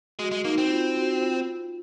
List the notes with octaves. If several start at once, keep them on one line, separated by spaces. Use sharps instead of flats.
G#3 F#4
G#3
A#3 D#4
C4
F4
F#4
F4